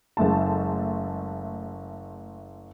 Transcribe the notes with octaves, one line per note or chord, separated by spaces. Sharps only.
F#1 G#3 A3 A5